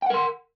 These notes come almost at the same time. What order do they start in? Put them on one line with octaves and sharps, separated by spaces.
G5 F#5 A#4 C6